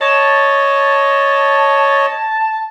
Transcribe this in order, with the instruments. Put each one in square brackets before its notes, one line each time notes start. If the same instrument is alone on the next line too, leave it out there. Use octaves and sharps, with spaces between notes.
[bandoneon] C#5 D#5 [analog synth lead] A5